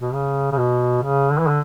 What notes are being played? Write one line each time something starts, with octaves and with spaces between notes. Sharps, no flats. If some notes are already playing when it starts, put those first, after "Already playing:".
B2
C#3
C#3
B2
C#3
D3
E3
D3